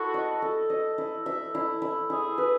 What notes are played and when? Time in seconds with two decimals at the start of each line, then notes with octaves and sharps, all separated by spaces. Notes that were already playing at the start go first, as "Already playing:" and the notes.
Already playing: E4 F#4 A4
0.14 D#5
0.42 A4
0.70 D#5
0.98 E4
1.26 E5
1.55 E4
1.82 E4
2.10 E4 G#4
2.38 B4